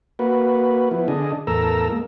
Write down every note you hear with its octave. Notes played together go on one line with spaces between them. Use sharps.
A#3 F#4 B4
F3 B3 E4
D3 D4 G#4 D#5
E2 A2 A4 A#4 A#5 E6
G#3 A#3